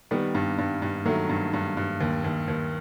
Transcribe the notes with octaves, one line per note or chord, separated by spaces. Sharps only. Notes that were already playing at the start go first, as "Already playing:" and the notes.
D#3 G3 B3
G2
G2
G2
D#3 F#3 A3
G2
G2
G2
D#2
D#2
D#2